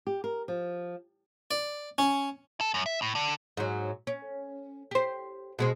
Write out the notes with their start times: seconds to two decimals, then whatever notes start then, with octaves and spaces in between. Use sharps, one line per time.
0.07 G4
0.24 A#4
0.48 F3
1.51 D5
1.98 C#4
2.61 A4
2.74 F#2
2.86 E5
3.02 A2
3.15 D3
3.57 G#2 F#3
4.07 C#4
4.91 G4 C5
5.59 B2 G#3 C4